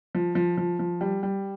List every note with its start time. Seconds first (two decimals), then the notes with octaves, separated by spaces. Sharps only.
0.15 F3
0.35 F3
0.57 F3
0.79 F3
1.01 G3
1.23 G3